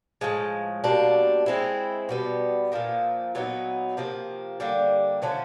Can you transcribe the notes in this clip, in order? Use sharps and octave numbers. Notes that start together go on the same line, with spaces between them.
A2 F3 G#3
B2 G3 A#3 D4
G#3 C4 E4
B2 G3 B3
A#2 F3 A#3
A#2 F#3 B3 D#4
C3 F3 A#3
D3 G3 A#3
D3 F3 A3 C#4